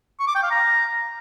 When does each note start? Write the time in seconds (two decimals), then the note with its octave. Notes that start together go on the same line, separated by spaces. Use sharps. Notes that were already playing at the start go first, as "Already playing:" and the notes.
0.19 C#6
0.27 D6
0.35 G5
0.43 F5
0.51 A#5